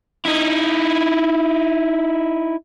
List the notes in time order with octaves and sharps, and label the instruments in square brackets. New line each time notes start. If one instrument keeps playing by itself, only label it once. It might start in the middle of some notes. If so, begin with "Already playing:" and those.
[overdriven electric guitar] D#4 E4